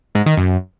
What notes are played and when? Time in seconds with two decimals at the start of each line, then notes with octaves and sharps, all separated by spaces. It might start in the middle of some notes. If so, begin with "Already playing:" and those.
0.15 G#2
0.26 D#3
0.37 F#2